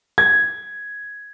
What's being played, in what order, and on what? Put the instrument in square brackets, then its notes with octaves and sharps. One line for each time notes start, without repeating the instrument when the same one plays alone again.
[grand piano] G#6